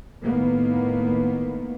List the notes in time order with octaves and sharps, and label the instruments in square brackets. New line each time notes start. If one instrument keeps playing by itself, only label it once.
[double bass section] A2 D#3 A#3 B3